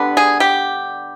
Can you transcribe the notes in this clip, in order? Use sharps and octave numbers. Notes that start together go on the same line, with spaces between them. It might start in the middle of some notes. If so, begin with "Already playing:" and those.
Already playing: D3 G3 B3 D4
G#4
G4